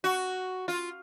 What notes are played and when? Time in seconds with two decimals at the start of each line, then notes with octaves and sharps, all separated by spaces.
0.04 F#4
0.68 F4